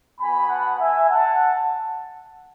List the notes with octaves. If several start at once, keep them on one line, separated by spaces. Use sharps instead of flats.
B3 F#4 G#5 B5
F#5 A5
E5 G#5
F#5 A5